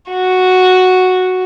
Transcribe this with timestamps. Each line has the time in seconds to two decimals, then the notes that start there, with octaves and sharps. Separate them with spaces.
0.11 F#4